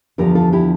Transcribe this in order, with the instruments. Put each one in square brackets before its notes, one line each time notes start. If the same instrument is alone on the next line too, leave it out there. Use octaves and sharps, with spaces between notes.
[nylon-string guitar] E2 D3 F3 G4 A#4
F4 A4
E4 G4